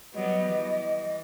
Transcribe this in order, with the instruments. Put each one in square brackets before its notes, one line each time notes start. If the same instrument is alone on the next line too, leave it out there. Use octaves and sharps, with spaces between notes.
[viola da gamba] F#3 G3 B3 [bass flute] D#5
[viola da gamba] E3